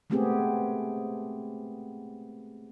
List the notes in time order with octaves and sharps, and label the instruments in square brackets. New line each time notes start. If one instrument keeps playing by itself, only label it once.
[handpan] G#3 A3 B3 C4 G4 G#4